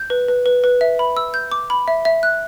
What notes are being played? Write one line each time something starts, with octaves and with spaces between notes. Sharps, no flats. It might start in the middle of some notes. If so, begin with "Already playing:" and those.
Already playing: G6
B4
B4
B4
B4
E5
B5
E6
G6
D6
B5
E5
E5
F#6